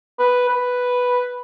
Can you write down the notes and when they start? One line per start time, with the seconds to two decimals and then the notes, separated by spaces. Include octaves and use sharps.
0.19 B4
0.49 B4